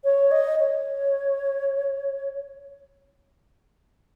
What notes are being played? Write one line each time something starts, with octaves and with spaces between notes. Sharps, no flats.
C#5
D#5
C#5